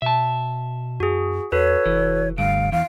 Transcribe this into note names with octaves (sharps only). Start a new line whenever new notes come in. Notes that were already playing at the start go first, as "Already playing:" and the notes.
B2 E5 A5
F#2 F#4 G#4
E2 F#4 A4 B4 C#5
F1 E3
D2 G2 F5 D7
E2 F5